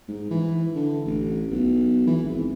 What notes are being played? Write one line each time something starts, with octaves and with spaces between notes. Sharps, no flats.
G#2
E3
D3
A1
B1
E3
G#1